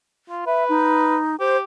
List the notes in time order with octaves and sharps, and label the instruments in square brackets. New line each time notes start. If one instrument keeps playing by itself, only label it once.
[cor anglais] F4
[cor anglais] B4 [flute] E5
[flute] D#4
[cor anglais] G4 [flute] C5